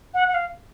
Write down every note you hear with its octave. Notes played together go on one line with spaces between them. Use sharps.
F#5
F#5
F5